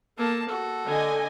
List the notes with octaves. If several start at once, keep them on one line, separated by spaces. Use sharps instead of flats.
A#3 A4 A5
F#4 A4
D3 D#5 G#5